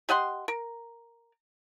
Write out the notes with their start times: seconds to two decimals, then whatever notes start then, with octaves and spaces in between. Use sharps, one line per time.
0.09 G4 D#5 F#5 C6
0.48 A#4